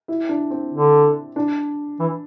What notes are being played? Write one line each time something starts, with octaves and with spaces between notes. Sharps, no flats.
E4
D4
C4
D3
D4
E3